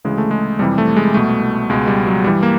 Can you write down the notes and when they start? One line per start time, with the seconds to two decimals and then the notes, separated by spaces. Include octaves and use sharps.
0.04 D2 C#3 E3 G#3
0.18 A3
0.31 G#3
0.59 F2 C3 E3 G3
0.78 A3
0.96 G#3
1.14 C2 B2 A3
1.69 C#2 B2 G#3
1.87 G3
2.06 F#3
2.24 G2 E3 G3
2.43 A#3